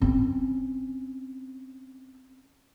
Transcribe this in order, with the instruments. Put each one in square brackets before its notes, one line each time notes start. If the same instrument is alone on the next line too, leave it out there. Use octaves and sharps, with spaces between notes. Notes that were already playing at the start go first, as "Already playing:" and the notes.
[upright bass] C4 C#4